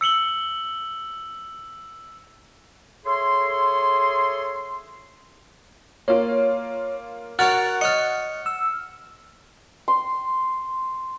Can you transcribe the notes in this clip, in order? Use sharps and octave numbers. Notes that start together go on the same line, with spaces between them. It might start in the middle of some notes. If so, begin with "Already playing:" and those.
E6 C#7 F#7 G7
G#4 A4 C#5 E5 C6
A#3 F4 C#5
F#4 A#4 C#5 F#5 F6 F#6 A6
C#5 D#5 F6 C#7
E6
C6